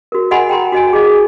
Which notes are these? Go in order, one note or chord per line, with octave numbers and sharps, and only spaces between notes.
F#4 A#4
D#5 F#5 G#5 B5 C6
G5 A#5 C6
F#4 D#5 G#5
G#4 D#5